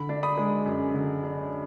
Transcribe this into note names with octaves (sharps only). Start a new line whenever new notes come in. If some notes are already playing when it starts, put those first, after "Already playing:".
Already playing: D3 B5
D4
B5 D#6
G#3
F#2
D3
D4